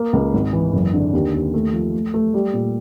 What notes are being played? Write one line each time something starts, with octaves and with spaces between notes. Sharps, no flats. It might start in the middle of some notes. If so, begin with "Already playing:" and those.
Already playing: A#3
C#2
G#1
E3
F#1
D3
D#2
D#2
A3
F3
A3
A3
G3
A#2